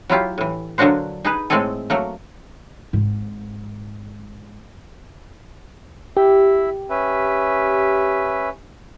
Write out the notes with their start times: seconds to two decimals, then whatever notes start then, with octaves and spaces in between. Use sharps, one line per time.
0.09 F#3 E4 F4 G4
0.38 A2 E3
0.78 D3 F#3 A#3 D4 F#4 C5
1.25 D#4 G#4 B4
1.50 A2 G#3 A3 C4 G#4 A4
1.90 F#3 A3 A#3
2.93 G#1 G#2
6.17 E4 G4 E5
6.90 C#4 B4 E5